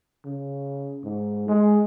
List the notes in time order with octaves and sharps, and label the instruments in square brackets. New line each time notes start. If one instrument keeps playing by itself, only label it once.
[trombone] C#3
G#2
G#3